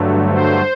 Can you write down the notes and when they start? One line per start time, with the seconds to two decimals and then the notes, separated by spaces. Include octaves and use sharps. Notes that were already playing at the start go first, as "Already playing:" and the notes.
Already playing: G2 D3 F#3 A3
0.31 C5